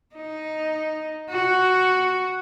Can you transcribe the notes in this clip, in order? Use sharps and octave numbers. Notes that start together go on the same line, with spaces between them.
D#4
F#4